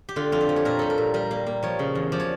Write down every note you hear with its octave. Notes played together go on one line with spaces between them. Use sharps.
G4
D3 F4
F2 F4
G4
F3
C#5
A#2 A#4
G3 A4
A#4
A#2
G3 A#4
A#3
A#3
F3 C#5
C#3
E2
F3 D5
C#5